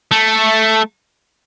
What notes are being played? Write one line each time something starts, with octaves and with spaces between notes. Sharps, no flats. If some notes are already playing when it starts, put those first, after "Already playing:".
A3